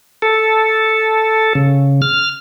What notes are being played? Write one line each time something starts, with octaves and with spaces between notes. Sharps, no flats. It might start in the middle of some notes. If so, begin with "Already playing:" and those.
A4
C#3
F6